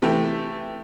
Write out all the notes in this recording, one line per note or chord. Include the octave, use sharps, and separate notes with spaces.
C3 E3 A3 G4